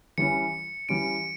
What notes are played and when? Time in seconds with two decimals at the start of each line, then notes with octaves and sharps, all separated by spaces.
0.18 E3 G3 C#4 C#7
0.89 E3 G3 C#4 D7